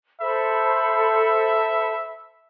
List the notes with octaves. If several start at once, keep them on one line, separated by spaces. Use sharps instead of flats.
A4 C5 E5 B5